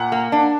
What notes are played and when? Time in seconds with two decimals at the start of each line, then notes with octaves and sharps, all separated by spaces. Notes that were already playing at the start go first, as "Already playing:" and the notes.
Already playing: A#2 F#5
0.12 A#3
0.32 D4